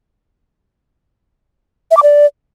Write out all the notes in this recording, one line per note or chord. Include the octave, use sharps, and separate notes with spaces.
E5
D6
D5